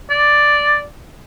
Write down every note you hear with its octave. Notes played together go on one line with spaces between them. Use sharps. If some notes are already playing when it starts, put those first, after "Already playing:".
D5